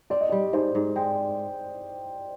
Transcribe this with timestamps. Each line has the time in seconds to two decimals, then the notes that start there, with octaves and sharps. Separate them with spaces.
0.10 C4 D5
0.21 D#5
0.29 G3 D5
0.53 G#2 C5
0.75 G#2
0.96 G#3 G5